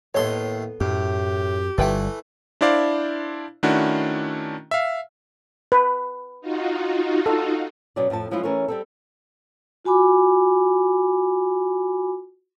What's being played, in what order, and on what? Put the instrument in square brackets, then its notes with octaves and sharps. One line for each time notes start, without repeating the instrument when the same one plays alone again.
[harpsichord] D#2 A2 C6 [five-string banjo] B3 A4 C#5
[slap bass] F#2 [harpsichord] A2 [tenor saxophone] G4
[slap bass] G1 G3 [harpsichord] E3 A3 [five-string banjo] F4 B4 G5
[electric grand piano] D4 E4 C5 D5 F5
D#3 A3 C#4 D4 E4 F#4
E5 F5
[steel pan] B4
[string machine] D#4 F4 F#4
[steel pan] A4
[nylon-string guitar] B2 F#3 B3 C#4 D5
F2 A2 F3 A5
E3 F3 G#3 C#4 E4 F4
E3 A3 C#4 A#4 B4 C#5
G3 C4 A4
[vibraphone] F4 F#4 G#5 B5 D6